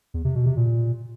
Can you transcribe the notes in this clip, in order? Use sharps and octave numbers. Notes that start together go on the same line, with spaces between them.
E2
C3
B2
C3
A#2